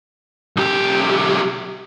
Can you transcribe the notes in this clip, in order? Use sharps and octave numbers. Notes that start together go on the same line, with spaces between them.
B1 G4